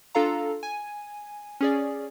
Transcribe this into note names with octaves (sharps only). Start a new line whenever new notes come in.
D4 F4 A4 F5 A#5
G#5
C#4 G#4 D5